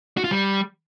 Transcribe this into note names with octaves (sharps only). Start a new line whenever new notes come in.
F#4
F4
G3